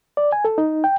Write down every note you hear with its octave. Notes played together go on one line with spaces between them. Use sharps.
D5
G#5
A4
D#4
G5